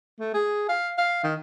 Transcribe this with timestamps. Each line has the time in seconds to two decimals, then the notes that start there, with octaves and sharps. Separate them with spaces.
0.20 A3
0.34 G#4
0.69 F5
0.98 F5
1.24 D#3